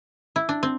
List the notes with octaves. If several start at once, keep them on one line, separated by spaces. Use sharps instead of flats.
E4
D4
C4